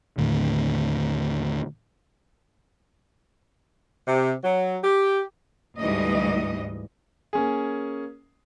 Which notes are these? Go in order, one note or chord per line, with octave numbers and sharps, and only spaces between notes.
D#2 A2 D3
C3
F#3
G4
D2 G#2 E3 G3 D#5
A#3 C#4 G#4